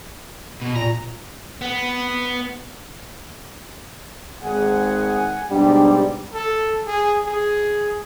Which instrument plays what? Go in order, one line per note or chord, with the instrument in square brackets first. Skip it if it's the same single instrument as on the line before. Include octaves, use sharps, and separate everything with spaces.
[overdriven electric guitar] B2
[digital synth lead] A#2 [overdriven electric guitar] A#5
[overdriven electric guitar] B3
[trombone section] G#1 G#2 G#4 [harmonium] F#5 G#5
[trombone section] G#2 B2 G3 [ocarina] D4 [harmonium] G4
[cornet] A4
G#4
G#4